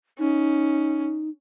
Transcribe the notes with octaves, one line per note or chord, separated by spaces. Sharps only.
C#4 D#4